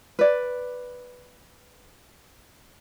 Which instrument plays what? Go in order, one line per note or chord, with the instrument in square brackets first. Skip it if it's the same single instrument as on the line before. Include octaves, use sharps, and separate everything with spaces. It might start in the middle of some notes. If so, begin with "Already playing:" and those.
[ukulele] B4 D5